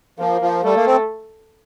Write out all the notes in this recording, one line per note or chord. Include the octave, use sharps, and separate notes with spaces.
F3 A#3
F3
G3 A3
A#3
C4